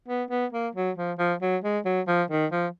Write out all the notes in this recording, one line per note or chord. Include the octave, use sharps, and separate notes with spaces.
B3
B3
A#3
F#3
F3
F3
F#3
G#3
F#3
F3
D#3
F3